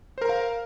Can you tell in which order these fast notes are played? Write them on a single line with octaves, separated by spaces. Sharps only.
C5 A#4 A#5 F5